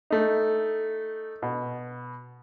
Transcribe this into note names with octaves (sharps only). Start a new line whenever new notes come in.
A3 D#4
B2